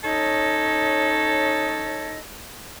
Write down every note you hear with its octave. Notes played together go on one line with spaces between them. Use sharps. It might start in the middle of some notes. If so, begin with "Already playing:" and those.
C#4 D#4 A4 C#5 D#5